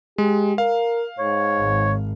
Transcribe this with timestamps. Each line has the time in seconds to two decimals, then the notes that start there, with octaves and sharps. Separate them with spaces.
0.18 G#3 G4
0.58 A#4 F5
1.19 G#2 C#5
1.59 G#1